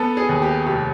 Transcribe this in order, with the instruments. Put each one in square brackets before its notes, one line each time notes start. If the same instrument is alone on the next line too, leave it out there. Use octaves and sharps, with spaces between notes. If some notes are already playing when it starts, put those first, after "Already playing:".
Already playing: [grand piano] B3 A4
G#4
D#2
G4
F1 G4